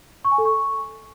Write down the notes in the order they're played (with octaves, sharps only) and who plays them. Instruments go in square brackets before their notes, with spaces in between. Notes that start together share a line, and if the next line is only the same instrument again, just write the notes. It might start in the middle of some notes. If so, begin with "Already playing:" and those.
[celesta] C#6
G#5
A4
C#6